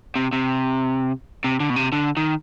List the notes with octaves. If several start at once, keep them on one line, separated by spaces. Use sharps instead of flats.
C3
C3
C3
D3
B2
C3
D3
D#3